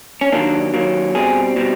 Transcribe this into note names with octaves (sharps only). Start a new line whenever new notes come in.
C#4
D#3 F#3 A#3 D4
D#3 F#3 A#3
B2 G3 C4 G#4
B2 G3 C4